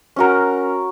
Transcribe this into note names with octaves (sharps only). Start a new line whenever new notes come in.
C#4 F#4 A#4